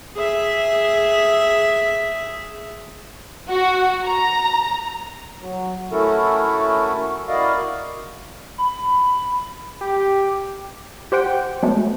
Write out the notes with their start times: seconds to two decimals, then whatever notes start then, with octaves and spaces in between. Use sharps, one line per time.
0.17 G#4 E5
3.50 F#4
4.06 A#5
5.41 F#3
5.92 A3 C#4 E4 F#4 A4 A#4
7.28 E4 F#4 A#4 D5 D#5 F5
8.58 B5
9.81 G4
11.12 G4 C5 F#5 G5
11.63 F#3 G#3 A3 B3